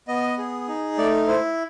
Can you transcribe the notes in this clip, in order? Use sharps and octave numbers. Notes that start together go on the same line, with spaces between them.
B3 D#5
G#4
D#4
A3 D5
E4 C5